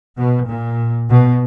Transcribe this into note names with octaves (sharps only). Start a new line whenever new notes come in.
B2
A#2
B2